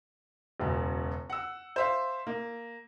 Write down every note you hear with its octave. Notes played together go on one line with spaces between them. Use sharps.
E1 F#2 C#3
F#5 E6
C5 E5 F5
A#3